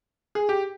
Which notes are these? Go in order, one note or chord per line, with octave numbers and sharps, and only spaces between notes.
G#4
G4